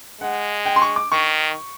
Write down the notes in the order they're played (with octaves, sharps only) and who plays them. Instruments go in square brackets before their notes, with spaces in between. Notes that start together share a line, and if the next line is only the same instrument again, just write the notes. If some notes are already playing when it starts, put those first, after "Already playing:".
[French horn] G#3 [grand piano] F#5
[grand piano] G5
C6
C#6
D6
[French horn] D#3 [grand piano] C#6